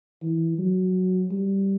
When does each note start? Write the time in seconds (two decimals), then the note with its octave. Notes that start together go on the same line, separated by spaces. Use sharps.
0.22 E3
0.58 F#3
1.31 G3